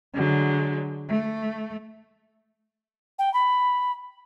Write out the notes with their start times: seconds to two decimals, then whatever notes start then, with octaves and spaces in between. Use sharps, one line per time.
0.13 D3 F#3 G#3
1.09 A3
3.18 G5
3.33 B5